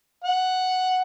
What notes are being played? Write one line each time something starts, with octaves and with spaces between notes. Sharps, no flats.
F#5